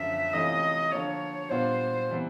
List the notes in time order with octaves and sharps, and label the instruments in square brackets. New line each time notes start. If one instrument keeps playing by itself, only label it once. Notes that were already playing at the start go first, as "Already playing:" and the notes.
Already playing: [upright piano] F#2 D3 F3 [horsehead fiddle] E5
[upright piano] C3 E3 A3 C#4 F4 [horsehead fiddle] D#5
[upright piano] D3 F3 A#3 [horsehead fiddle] C#5
[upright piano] A#2 G3 B3 D4 F4 [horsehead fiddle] C5
[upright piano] C3 E3 G3 B3